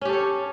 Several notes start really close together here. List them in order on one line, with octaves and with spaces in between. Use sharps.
C#4 G4 A4 C#5